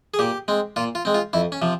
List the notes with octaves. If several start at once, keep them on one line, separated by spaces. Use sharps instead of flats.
G#4
A#2 G4
G#3 C4
A#2 F4
F4
G#3 C4
F4
F2 E4
C#4
C3 F3